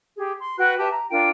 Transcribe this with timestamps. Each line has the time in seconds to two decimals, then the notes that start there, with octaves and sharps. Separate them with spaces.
0.17 G4 G#4
0.40 C6
0.58 F#4 B4 G5 F#6
0.79 G4 B4 E5 A5
0.91 A#5
1.10 D4 F4 A#4 G5